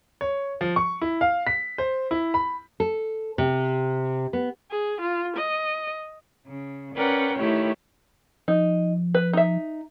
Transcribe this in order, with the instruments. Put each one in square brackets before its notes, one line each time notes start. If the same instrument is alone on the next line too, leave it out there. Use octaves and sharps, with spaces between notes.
[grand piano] C#5
F3
C#6
E4
F5
B6
C5
E4
B5
[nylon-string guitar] A4
C3
B3
[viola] G#4
F4
D#5
[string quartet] C#3
C#4 A#4 B4 D5 F#5 G5
D#3 A3 E4 G4 C#5
[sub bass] F3 [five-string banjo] D#4
[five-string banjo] B4
D#4 E5